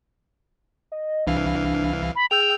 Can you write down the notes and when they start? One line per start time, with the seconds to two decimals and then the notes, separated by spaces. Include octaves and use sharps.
0.92 D#5
1.27 C2 E3 D4 F5
2.16 B5
2.31 G#4 G5 E6 G6 F7